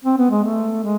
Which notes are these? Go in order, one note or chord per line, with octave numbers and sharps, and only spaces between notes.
C4
B3
G#3
A3
G#3